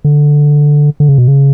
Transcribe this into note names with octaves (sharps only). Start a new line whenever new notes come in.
D3
D3
C#3
B2
C#3